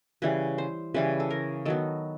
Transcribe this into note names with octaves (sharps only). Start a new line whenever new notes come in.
C#3 E3 G3 B4
C5
C#3 E3 G3 B4
A4
A#4
D#3 F#3 B3 A4